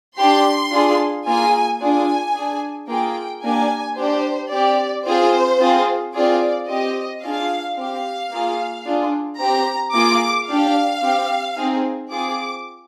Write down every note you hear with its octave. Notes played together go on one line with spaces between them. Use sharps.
D4 G4 C6
D4 F4 G#4
A#3 F4 G#4 G#5
D4 F4 G#4 G#5
D4 G#4
A#3 F4 G#4 G5
A#3 D4 G4 G#5
D4 G4 C5
C4 G4 D5
C4 F4 G#4 C5
C4 F4 G#4
C4 F4 G#4 D5
C4 G4 D#5
D4 F4 G#4 F5
C4 G4 F5
A#3 F4 G#4
D4 F4 G#4
C4 G4 A#5
A#3 F4 G#4 D6
D4 G4 F5
C4 G4
C4 D#4 G#4
C4 F4 G#4 D6